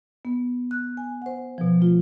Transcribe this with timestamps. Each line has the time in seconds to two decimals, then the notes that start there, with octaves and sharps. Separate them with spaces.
0.25 B3
0.71 F#6
0.97 G#5
1.22 C5 F#5
1.58 B2 F3
1.80 A3 F4